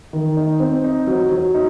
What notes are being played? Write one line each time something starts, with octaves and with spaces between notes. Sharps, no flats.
D#3
D#4
C4
D#4
F#3
F#3
D#4